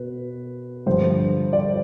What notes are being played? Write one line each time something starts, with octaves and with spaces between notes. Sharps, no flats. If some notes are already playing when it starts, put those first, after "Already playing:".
Already playing: B2 B4
G2 D3 F3 C5
D5